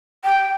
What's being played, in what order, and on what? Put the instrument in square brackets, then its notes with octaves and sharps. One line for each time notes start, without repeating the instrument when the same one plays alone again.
[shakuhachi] G5